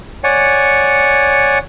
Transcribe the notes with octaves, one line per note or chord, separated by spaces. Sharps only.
C#5 D5 F#5 G#5